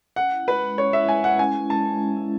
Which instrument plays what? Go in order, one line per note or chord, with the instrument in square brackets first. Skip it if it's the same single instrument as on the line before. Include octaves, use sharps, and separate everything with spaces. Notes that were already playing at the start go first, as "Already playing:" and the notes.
[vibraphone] C#4 [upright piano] F#5
[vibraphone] E4
[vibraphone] G#3 [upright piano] B4
[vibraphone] G#3
[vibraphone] C#4 [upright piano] C#5
[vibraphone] E4 [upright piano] E5
[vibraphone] G#3 [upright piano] G#5
[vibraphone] G#3 [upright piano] F#5
[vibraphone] C#4 [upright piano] G#5
[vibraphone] E4
[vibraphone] G#3 [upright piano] A5
[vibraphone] G#3
C#4
E4